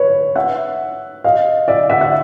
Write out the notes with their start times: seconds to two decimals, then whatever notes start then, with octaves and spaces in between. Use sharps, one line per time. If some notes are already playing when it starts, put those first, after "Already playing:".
Already playing: B4 C#5
0.36 E5 F#5
1.24 D#5 F5
1.68 D5 E5
1.90 E5 F#5
2.01 E5 F#5